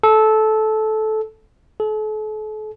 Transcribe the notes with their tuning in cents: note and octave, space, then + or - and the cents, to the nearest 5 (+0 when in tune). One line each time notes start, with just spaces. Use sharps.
A4 -15
A4 -40